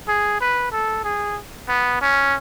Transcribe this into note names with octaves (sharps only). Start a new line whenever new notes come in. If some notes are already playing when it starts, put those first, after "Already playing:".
G#4
B4
A4
G#4
B3
C#4